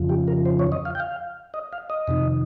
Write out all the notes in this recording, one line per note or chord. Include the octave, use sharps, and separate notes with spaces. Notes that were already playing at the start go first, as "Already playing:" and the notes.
Already playing: F2 C#3 F3
G4
A#4
C5
C#5
D#5
F5
G5
F5
D#5
F5
D#5
F2 C3 D#3